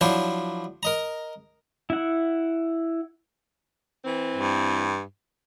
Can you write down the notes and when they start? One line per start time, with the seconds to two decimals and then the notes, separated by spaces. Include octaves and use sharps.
0.01 F3 F#3 D4 E4 C5
0.83 A#4 D#5 A#5
1.90 E4 F#5
4.05 E3 C4
4.36 G2